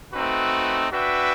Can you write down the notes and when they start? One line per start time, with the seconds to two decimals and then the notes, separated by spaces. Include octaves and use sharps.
0.13 A3 C4 D#4 F#4 B4
0.91 D4 F#4 B4 E5 G5